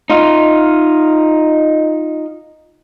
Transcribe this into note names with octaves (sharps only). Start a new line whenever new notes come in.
D#4 F4